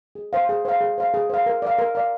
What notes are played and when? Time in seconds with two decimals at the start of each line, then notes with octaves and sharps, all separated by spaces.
0.15 G#4
0.33 C5 F5
0.49 G#4
0.65 C5 F5
0.81 G#4
0.98 C5 F5
1.14 G#4
1.30 C5 F5
1.46 A#4
1.62 D5 F5
1.78 A#4
1.95 D5 F5